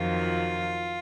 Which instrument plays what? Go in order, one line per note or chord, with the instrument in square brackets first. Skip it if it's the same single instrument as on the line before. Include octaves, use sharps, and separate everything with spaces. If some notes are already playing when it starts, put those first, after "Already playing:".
Already playing: [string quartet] F2 D#3 F#3 F4